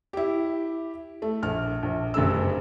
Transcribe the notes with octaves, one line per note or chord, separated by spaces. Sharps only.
E4 G4
A3
A#1 F6
A#1
F#1 G2 A3 E6